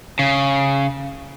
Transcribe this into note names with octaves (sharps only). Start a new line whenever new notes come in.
C#3